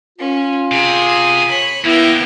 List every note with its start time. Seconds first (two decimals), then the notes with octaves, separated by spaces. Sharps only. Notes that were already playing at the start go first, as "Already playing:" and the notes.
0.19 C#4 F4
0.71 C3 G#4 D#6
1.47 C#5 B5
1.84 E2 A#3 B3 E4 G5